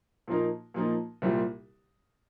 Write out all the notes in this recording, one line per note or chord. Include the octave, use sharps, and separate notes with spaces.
A#2 F3 A#3 D#4
A#2 F3 A#3 D#4
C2 A#2 G3 C4